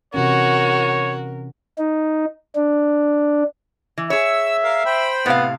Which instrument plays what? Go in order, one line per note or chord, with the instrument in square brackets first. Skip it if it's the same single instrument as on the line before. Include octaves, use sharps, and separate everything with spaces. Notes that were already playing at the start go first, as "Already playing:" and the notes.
[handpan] C3 E3 C#4 [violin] F#4 [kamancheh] A#4 [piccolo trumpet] C#5
[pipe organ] D#4
D4
[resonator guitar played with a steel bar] E3
[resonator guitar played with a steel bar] G#4 C#5 [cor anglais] E5 [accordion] E6
[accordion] A#4 F5
C5 G5 B5
[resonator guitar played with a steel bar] A2 C3 F5 [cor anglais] B3